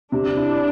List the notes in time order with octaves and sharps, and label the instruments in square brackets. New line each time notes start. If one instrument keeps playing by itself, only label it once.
[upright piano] C3 [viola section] D4
[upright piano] E4